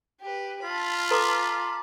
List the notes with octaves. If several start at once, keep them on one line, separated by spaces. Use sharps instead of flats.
G4 B4
F4 A5 B5
A4 B4 A#5 C6 D6